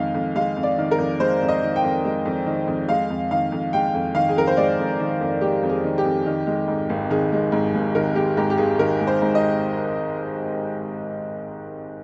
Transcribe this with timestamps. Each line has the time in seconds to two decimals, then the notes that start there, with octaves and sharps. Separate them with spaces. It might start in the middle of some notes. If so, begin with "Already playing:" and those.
Already playing: F2 D#3 G#3 F5
0.14 F2
0.35 G#3 F5
0.56 F2
0.63 D5
0.78 D#3
0.91 A#4
0.98 F2
1.20 G#3 C5
1.42 F2
1.48 D#5
1.63 D#3
1.76 G5
1.83 F2
2.05 G#3
2.25 F2
2.46 D#3
2.67 F2
2.89 G#3 F5
3.10 F2
3.31 D#3 F5
3.52 F2
3.73 G#3 G5
3.94 F2
4.15 D#3 F5
4.29 G#4
4.37 F2 A#4
4.47 C5
4.57 G#3 D5
4.79 F2
5.00 D#3
5.21 F2
5.41 G#3 G4
5.63 F2
5.69 G#4
5.84 D#3
5.98 G4
6.05 F2
6.26 D#3
6.47 G#3
6.68 G#2
6.90 G#1
7.10 D#3 G#4
7.32 G#3
7.52 G#2
7.74 G#1
7.95 D#3 A#4
8.15 G#3 G4
8.37 G#2 G4
8.50 G4
8.58 G#1 G#4
8.79 D#3 A#4
9.00 G#3
9.07 C5
9.22 G#2
9.35 D#5